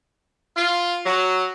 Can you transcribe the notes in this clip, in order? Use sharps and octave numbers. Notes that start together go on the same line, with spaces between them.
F4
F#3